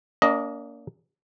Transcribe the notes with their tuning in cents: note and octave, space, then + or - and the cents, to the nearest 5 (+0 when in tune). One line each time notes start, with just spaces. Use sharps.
A#3 +0 D4 -45 D#5 +0